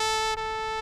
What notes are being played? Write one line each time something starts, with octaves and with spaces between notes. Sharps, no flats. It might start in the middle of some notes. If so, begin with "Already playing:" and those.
Already playing: A4
A4